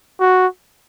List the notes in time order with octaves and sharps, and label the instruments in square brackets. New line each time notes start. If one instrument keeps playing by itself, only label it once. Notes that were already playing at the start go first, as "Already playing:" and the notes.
[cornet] F#4